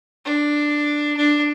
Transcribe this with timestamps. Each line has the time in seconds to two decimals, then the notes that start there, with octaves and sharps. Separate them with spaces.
0.25 D4
1.16 D4